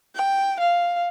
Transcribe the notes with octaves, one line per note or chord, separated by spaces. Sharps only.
G5
F5